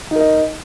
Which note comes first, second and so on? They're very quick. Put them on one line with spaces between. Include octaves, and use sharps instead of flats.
D#4 A#4 D#5